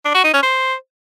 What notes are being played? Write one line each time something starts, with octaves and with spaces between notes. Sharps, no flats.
D4
F#4
D#4
C#4
C5